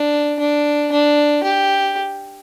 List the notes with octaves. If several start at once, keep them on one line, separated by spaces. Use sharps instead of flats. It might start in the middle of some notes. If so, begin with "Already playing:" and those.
Already playing: D4
D4
D4
G4